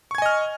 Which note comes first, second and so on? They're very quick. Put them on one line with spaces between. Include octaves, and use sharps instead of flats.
C#6 G#6 G#5 D#5 F6